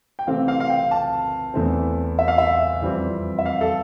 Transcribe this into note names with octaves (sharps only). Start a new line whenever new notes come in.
G5
C3 E3 A3 C4 F5
F5
F5
G5
A5
E2 E3 A3 C4
E5
F5
E5
F2 E3 G3 C4
E5
F5
A4